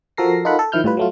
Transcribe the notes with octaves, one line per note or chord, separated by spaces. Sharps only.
F3 F#4 A4 A#4 A#6 C7
D#4 F4 A4 A#4 F#5 B5
A4
D#3 F3 E4 F6 G6
A2 G3 F4 B4
F#3 A3 F4